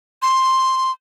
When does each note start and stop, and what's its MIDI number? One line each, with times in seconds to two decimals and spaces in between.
0.22 0.92 84